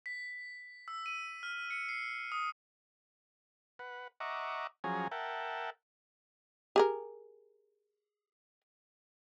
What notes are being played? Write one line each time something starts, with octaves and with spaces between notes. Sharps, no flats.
B6
E6
D#7
F6
C#7
C7
D#6
B4 F#5
D#5 E5 F#5 A#5 C#6 D6
F3 F#3 C#4 G#4 G#5 A#5
A#4 E5 F#5 G5 A5
G4 G#4 A#4